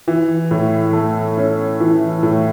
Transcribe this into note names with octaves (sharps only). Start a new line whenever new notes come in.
E3
A2
A3
C#4
E3
A2